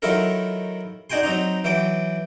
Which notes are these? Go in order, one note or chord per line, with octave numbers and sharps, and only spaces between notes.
D#3 F#3 E4 F4 A4 A#4
D4 D#4 F#4 G5 G#5 C6
F#3 C4 D#4 A#5
E3 F#3 G5 D6